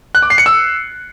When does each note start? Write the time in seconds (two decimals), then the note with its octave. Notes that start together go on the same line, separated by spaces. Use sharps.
0.15 F#6
0.22 D6
0.30 C7
0.38 C#7
0.46 E6